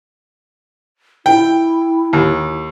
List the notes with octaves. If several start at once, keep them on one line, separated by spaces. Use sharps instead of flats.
E4 G5
D#2